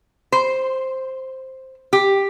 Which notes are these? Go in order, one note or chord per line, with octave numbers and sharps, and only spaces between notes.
C5
G4